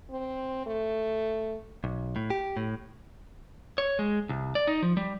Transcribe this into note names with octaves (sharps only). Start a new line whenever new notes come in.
C4
A3
B1
A2
G4
A2
C#5
G#3
C2
D5
D#4
F3
G3